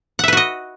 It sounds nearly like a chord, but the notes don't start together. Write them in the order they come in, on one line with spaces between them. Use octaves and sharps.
F#5 E5 B4 F#4 D#5